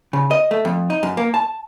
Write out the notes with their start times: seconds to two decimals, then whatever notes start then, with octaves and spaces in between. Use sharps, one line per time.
0.13 C#3
0.31 D#5
0.51 A3
0.65 F2
0.90 D#4
1.03 F#2
1.17 A#3
1.34 A5